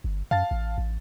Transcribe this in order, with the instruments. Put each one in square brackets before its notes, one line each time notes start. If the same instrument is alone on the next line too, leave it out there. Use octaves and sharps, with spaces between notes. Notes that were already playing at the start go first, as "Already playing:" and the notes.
[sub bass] G1
[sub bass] F#2 [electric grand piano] F5 A5 A6
[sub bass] A1
A1